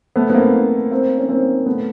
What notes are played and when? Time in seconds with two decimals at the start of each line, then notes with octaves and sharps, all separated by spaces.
0.16 A3 B3
0.30 B3
0.34 A#3 C4
0.91 A#3 C4
1.18 C#4
1.29 A#3 C4
1.66 A3 B3